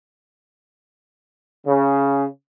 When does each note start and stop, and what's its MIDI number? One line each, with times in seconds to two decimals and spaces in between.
1.66 2.24 49